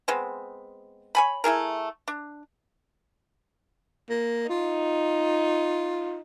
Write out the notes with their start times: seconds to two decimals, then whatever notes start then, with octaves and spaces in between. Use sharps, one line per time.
0.08 G#3 B3 C4
1.15 C#5 G#5 B5
1.44 A3 E4 G#4 A#4
2.08 D4
4.10 A#3
4.49 D#4 F4